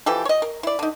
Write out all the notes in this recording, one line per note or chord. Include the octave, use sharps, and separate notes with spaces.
E3 F3 G4 A4
C#5 D#5
A#4
E4 D5
D3 D#4